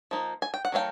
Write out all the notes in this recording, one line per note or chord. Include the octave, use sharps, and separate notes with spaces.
F3 A#3 D#4
G#5
G5
F#5
D#3 F#3 A3 C#4 F5 G5